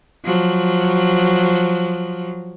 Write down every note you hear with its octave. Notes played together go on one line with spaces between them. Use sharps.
F3 F#3